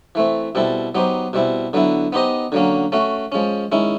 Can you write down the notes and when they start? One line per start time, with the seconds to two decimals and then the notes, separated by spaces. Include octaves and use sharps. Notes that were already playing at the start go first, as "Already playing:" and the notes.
0.15 E3 A3 C4
0.55 B2 G3 C4 E4 A4
0.95 F#3 B3 D#4 G4 C5
1.33 B2 G3 C4 E4
1.73 D3 F#3 B3 E4
2.13 B3 D#4 G4 C5 D#5
2.52 D3 F#3 A#3 C#4
2.92 A3 C#4 F#4
3.32 F3 G#3 C#4
3.72 D#3 G#3 C#4 E4